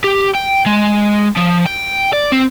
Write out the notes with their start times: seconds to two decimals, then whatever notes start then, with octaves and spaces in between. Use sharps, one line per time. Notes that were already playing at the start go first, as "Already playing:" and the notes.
0.04 G4
0.35 G5
0.66 G#3
1.36 F3
1.65 G5
2.13 D5
2.32 C4